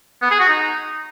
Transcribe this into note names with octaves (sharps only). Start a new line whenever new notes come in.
B3
G#4
F#4
D#4